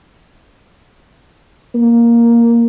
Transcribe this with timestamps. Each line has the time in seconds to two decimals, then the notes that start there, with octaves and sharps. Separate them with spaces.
1.75 A#3